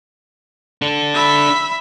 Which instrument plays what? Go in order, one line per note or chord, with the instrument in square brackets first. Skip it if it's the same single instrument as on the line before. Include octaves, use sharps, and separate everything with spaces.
[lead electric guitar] D4 A4
[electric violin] E5 B5